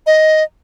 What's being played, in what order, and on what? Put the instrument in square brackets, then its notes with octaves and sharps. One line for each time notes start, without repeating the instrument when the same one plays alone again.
[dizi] D#5